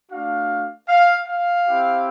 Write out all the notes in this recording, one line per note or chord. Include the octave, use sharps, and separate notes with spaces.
A3 D4 F#4 F5
F5
F5
C4 E4 G4